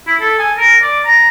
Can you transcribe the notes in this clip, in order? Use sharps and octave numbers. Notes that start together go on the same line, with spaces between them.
E4
A4
G#5
A#4
D5
A#5